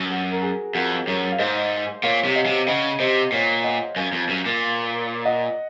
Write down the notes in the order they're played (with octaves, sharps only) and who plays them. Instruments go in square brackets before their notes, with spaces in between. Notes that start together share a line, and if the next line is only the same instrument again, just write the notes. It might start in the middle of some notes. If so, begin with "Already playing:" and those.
Already playing: [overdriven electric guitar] F#2
[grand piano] F#4
A#4
G#4
[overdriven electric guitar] F2 [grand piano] F#4 A#4
[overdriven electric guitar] F#2 [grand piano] A#4 C#5
[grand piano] F5
[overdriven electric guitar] G#2 [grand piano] C5 D#5
[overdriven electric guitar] A#2 [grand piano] C#5 F5
[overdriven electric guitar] C3
[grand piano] D#5 F#5
[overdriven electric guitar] C3
[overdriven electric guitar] C#3 [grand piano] D#5 F#5
[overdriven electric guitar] C3 [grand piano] C5 D#5
[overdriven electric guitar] A#2 [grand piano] C#5 F5
[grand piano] D#5 F#5
[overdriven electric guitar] F#2 [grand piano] F5 G#5
[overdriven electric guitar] F2
F#2
A#2
[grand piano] D#5 F#5